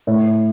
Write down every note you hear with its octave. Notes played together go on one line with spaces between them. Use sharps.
A2